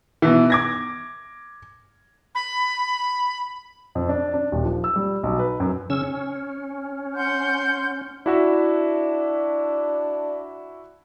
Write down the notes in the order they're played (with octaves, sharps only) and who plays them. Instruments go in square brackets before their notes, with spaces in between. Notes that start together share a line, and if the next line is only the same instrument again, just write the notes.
[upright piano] B2 E3
D6 G#6 A#6
[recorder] B5
[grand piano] F2
D4
D4
D#1
F3
E6
G3
B1
B4
F#2
[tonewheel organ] C#3 C#4 E6
C#4
[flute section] F#5 C6 G6
[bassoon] D4 [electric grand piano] E4 F#4 E5